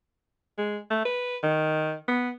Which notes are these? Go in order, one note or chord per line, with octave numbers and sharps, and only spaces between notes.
G#3
A3
B4
D#3
B3